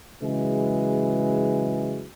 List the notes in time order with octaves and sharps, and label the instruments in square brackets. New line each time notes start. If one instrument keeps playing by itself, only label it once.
[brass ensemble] C#3 E3 F#3 G#3